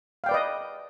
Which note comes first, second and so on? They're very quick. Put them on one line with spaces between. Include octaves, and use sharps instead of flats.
F5 G5 D5 B4 D#5